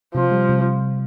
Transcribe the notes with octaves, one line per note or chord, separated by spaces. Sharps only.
C3 F3
G3
C3